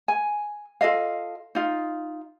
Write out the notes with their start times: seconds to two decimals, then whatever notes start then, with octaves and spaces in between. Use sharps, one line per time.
0.08 G#5
0.81 F4 A4 D#5 F5
1.55 D#4 F4